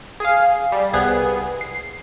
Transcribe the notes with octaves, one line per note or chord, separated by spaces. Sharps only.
G#4 F5
G3
C2 B3 G#4
C7